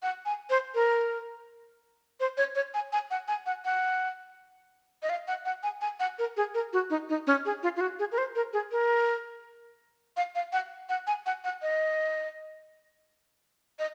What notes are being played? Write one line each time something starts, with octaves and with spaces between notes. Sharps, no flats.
F#5
G#5
C5
A#4
C5
C#5
C#5
G#5
G#5
F#5
G#5
F#5
F#5
D#5
F5
F#5
F#5
G#5
G#5
F#5
A#4
G#4
A#4
F#4
D#4
D#4
C#4
G#4
F4
F4
F#4
G#4
A#4
C5
A#4
G#4
A#4
F5
F5
F#5
F#5
G#5
F#5
F#5
D#5
D#5